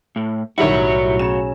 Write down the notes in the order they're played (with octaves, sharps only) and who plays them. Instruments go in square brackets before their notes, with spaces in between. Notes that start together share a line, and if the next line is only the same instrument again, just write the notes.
[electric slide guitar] A2
[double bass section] B1 A2 [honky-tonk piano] D#3 G3 E4 [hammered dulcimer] F#3 [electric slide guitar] F#4 C#5
[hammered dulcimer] C#3 [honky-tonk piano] E7